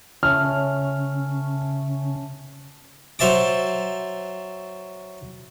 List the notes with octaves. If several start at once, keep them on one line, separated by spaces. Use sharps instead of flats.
C#3 A3 C#4 F6
F#3 C5 E5 A5 D6